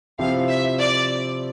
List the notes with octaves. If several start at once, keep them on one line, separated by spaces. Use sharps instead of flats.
C3 F3 C4 E4 G4 F5
E5
D5